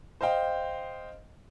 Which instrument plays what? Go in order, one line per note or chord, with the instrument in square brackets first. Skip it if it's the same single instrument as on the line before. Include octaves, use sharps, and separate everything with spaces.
[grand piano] C5 D#5 F5 G5